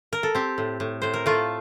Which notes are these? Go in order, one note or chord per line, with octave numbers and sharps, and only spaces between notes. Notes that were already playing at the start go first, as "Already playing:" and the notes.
A#4
A4
C4 G4
A2
A2
A2 C5
A#4
A3 F4 A4